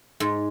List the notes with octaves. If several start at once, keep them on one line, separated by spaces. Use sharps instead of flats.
G#2